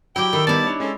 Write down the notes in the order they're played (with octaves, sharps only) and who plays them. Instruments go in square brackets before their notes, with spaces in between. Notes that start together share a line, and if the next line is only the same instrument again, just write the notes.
[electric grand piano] F#3 [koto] E4 G4 [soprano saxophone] G5
[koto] D#3 [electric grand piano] A4 B5 E6
[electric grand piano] G3 B3 D#4 [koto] E4 D5 [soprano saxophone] A5
[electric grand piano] D4 D#4 C#5
[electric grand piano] G#3 A4 [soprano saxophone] C#4